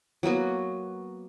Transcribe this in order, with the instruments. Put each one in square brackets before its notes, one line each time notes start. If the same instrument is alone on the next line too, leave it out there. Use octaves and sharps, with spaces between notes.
[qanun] F#3 A#3 B3 F#4